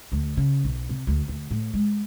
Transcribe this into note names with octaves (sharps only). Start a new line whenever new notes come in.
D2
C#3
B1
C3
D2
D2
A2
G#3